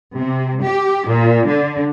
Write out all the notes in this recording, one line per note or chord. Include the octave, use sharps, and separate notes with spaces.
C3
G4
A#2
D3